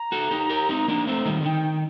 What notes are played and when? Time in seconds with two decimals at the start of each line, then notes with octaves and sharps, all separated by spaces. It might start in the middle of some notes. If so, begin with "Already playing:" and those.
Already playing: A#5
0.12 F#4 A4
0.31 D#4 G4
0.49 G4 A#4
0.69 C4 D#4
0.88 A#3 D4
1.07 A3 C4
1.25 D#3 G3
1.41 D3
1.45 D#3 G5